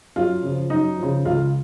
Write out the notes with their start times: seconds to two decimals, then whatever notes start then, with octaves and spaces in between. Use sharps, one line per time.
0.16 F#2 F4
0.43 C#3 F3
0.70 F#2 D#4
0.98 C#3 F3
1.25 C#2 F4